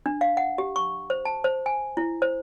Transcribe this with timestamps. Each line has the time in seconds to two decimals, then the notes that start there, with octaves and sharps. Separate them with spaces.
0.06 D4
0.21 F5
0.37 F#5
0.58 G4
0.76 C#6
1.10 C5
1.25 A5
1.44 C5
1.66 G#5
1.97 E4
2.22 C5